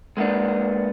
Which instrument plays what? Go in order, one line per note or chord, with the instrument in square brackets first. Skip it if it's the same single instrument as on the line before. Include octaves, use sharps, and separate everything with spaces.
[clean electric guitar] G#3 A#3 B3 D4